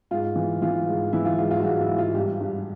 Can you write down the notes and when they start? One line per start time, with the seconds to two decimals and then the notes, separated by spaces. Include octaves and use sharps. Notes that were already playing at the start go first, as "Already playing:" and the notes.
0.11 G#2 F4
0.35 E3
0.62 E3 F4
0.87 G#2
1.13 E3 E4
1.25 F4
1.38 G#2 F4
1.51 F4
1.59 F#4
1.64 G#2 F4
1.80 E4
1.89 G#2
1.98 F4
2.15 G2 G4
2.41 G2